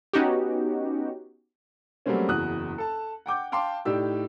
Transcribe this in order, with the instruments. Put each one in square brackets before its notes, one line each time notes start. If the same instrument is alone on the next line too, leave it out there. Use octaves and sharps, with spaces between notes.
[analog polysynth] B3 C#4 D#4 F#4 G4
[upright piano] F#3 G3 A3 A#3 C4 C#4
F#1 E2 F#4 D#6 F#6
A4 A5
F#5 G5 D6 G6
F5 G5 A5 C6 D6
A2 D#4 G4 D5 E6